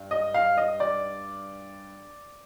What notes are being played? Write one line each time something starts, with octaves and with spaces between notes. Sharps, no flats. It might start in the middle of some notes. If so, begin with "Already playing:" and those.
Already playing: G2
D#5
F5
D#5
D5